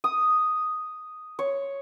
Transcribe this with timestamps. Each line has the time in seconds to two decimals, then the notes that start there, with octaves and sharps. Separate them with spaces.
0.04 D#6
1.39 C#5